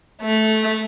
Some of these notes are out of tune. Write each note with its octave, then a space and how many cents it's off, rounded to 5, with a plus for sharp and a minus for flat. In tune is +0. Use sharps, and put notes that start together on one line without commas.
A3 -10